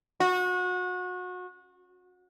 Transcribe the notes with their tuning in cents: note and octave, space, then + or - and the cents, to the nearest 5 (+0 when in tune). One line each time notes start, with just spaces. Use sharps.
F#4 -30